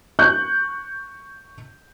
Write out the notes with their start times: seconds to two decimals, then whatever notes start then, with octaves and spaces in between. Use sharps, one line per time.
0.19 C#6 F#6 G6